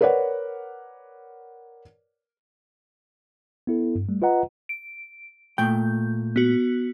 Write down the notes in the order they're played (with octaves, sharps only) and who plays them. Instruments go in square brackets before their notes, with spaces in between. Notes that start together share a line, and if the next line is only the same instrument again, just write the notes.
[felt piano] A#4 B4 C#5 D5 F#5
[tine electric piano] B3 E4 A4
G2
G3 A3
F4 B4 D#5 F#5 A#5
[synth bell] D7
[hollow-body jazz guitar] A#2 A3 G5 [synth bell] G6
[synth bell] B3 F#4